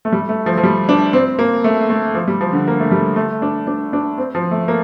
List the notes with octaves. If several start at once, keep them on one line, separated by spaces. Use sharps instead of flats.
A3
G3
A3
F3
F3
G3
D4
C4
A#3
A3
A3
F3
G3
F3
D3
A#3
A3
G3
A3
D4
D4
D4
C4
F3
A3
A#3